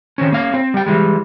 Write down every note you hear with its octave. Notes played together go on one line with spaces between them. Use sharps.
D#3 C4 C#4
A#3 C#4 F5
C4
G3 G5
E3 G3 G#3